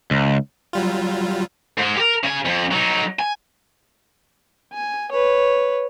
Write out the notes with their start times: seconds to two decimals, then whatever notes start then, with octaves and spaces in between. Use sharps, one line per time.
0.11 C#2
0.73 F#3 G3 F4
1.77 G#2 G#3
1.97 G4 A#4
2.23 C#3 G#5
2.45 F2
2.71 F#3 D#4
3.19 G#5
4.73 G#5
5.12 B4 C#5